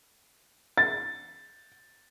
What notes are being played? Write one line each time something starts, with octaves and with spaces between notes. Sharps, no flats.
A6